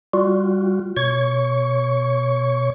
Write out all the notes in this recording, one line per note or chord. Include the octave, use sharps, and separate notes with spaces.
G3 F4 F#4
B2 C#5 C#6